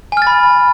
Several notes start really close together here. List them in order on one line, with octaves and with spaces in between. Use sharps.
G#5 F6 A6 B5